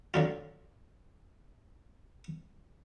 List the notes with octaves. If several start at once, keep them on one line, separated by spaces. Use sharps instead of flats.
D3 F#3 F4